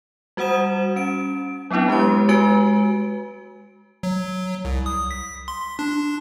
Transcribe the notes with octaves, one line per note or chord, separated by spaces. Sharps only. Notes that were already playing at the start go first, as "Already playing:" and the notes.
G3 F#4 C5 F#5 D#6 E7
C#4 D7
F#3 B3 C4 D4 E4
G#3 G4 B4 C6
G#3 F#4 B4 G#5 D7
F#3
C2
D#6
B6
C6
D4